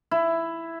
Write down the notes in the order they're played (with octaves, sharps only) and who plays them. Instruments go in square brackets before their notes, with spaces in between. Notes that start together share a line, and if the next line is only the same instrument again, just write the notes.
[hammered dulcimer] E4